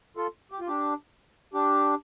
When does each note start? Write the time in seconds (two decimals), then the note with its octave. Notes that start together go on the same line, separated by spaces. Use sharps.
0.17 F4 A4
0.52 G4
0.60 F4
0.67 D4 G4
1.54 D4 G4